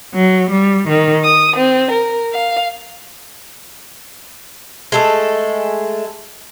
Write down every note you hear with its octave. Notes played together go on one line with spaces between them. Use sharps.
F#3
G3
D#3
D#6
C4
A#4
F5
G#3 A3 A4